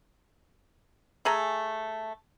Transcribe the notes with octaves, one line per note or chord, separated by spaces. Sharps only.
A3 G#4 G#5 A#5